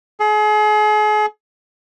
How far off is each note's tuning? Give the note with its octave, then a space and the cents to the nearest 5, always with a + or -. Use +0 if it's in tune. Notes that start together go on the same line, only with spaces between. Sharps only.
G#4 +35